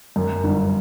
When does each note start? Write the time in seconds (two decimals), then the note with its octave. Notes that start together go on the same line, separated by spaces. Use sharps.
0.16 F#2
0.44 G1